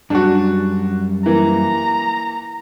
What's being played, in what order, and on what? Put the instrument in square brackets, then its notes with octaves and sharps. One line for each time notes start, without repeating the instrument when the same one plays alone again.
[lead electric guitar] F#2 G3 [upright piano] D4 F#4
[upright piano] E3 A#3 [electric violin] A#5